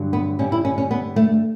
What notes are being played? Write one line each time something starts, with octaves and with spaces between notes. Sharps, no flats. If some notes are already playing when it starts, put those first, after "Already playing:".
Already playing: G2 D3 F#3
B3
G2 D3 G3 C#4
E4
C#4
C#4
B3
A3